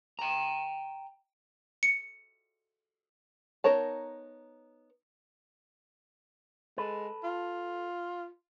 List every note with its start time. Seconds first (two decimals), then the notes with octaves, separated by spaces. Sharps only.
0.19 G5 A#5
1.83 C#7
3.64 B3 D#4 A#4 C#5 A5
6.78 G#3 A4 B4
7.24 F4